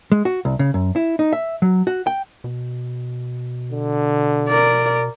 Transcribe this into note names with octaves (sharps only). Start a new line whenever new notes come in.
G#3
F#4
C2
C#3
F#2
E4
D#4
E5
F#3
F#4
G5
B2
D3
A#4 D5